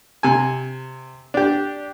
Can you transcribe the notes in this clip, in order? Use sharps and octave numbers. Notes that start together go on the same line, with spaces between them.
C3 G#5
D4 G4